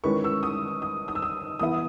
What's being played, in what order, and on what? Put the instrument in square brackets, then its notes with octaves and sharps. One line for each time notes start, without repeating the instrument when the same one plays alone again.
[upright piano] D#3 G#3 C#4 E4 B4 [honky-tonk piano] C#6
[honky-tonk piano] E6
D#6
D#6
D#6
E6
D#6
[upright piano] E3 B3 E4 B4 E5 [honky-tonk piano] D#6